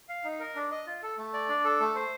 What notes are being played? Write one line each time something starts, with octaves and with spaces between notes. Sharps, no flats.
F5
D#4
A#4
D4
D#5
F4
A4
A3
D5
D4
A4
A3
C5